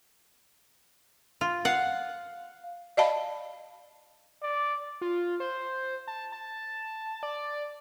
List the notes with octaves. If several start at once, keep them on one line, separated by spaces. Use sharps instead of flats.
F4
F5 F#5
D5 D#5 F5 A5 B5
D5
F4
C5
A5
A5
D5